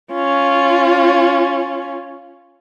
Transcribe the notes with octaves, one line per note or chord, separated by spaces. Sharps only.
C#4 F4